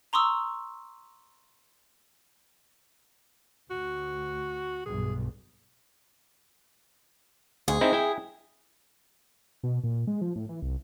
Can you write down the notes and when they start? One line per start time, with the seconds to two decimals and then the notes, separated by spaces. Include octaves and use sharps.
0.13 A#5 C6 C#6 D#6 E6
3.71 D2 F#4
4.86 B1 G2 G#4
7.68 D2 G#4
7.81 C4 D#4 E4
7.93 E4 G5
9.63 B2
9.84 A#2
10.07 G#3
10.21 F3
10.36 A2
10.49 E3
10.62 C2